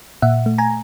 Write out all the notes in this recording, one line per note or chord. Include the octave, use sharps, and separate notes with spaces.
A#2 E5 F#5
A3
G#5 A#5